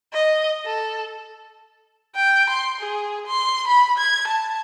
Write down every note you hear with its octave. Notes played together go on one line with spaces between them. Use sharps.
D#5
A4
G5
C6
G#4
C6
B5
G#6
A5